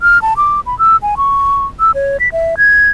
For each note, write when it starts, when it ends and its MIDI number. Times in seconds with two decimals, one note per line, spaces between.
0.01 0.21 89
0.22 0.34 81
0.37 0.60 86
0.66 0.77 83
0.79 0.97 88
1.02 1.15 80
1.17 1.65 85
1.80 1.91 88
1.95 2.17 73
2.20 2.29 95
2.32 2.55 76
2.58 2.90 92